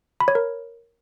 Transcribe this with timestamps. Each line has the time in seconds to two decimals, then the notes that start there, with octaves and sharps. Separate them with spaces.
0.20 B5
0.28 C#5
0.35 A#4